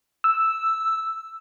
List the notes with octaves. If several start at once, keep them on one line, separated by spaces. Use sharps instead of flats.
E6